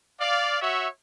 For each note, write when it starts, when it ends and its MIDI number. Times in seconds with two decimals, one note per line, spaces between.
0.21 0.60 74
0.21 0.60 77
0.61 0.88 66
0.61 0.88 73
0.61 0.88 76